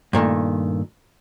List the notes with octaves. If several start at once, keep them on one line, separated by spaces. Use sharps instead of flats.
G2 A#2 D#3 A3